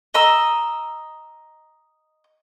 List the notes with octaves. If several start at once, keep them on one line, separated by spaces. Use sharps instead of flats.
D#5 A#5 E6